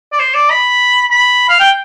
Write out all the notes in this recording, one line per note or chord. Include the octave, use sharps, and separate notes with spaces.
D5
C5
D5
B5
B5
F5
G5